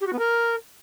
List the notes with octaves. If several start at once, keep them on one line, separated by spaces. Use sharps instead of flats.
G4
F#4
B3
A#4